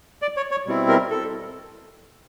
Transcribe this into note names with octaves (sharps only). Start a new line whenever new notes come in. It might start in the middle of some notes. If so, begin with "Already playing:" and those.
D5
C#5
C#5
B2 G3 C4 E4
A#4
A4